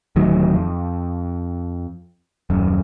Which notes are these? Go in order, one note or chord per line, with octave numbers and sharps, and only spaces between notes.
D1 D2 D#3 F#3
F2
D#1 F#2